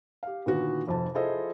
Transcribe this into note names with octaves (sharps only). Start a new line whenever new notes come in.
G4 F5
A#2 D3 D#3 B3 F#4
F1 F2 A5
E4 F4 G#4 A4 C5 D#5